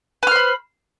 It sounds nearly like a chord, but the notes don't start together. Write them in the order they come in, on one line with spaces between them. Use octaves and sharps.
B4 F6 C5 B5